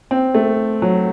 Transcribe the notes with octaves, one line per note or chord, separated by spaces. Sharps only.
C4
A3
F#3